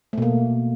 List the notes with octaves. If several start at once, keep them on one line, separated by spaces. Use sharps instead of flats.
B2 A3 A#3